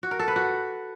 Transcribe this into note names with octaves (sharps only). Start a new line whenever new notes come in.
F#4
A#4
A4
B4
F#4